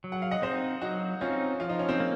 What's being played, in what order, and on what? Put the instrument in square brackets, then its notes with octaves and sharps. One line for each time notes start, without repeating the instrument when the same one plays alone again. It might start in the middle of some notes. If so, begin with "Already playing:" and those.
[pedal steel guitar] F#3
[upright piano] F#5
F5
D#5 F#5
[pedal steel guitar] C4 D#4 [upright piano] C5 D#5
[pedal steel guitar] F#3 [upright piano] D#4 F#4
[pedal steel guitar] C4 D#4 [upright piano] C#4 F4
[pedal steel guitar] F3 [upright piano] F4
[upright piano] D#4
C#4
C4 D#4
[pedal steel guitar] A#3